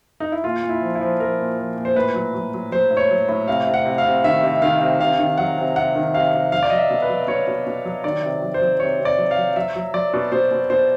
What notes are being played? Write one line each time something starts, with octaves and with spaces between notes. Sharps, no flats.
D#4
E4
A#2 F4
A#2
E4
F3
E4
F3
F3 A#4
A#2
F3
A#2
C5
A2 B4
F#3
F#3
F#3
F#3 C5
A2
C#5
F#3
A2
C3 F5
C3
F#5
C3
F5
C3
D#3 E5
C3
D#3 F5
C3
C3 F5
D#3
F#3 F#5
C3
C3 F#5
D#3
C3 F5
C3
F#3 F5
D5
F#3 D#5
E5
B2
B4
F#3
B2 C#5
B2
B2
F#3
D#3 D5
C3
F#3
C5
F#3
C3 C#5
C3
D5
F#3
F5
F#3
F#3 E5
F#3
F#3 D5
B2
B2 C5
B2
B2 C5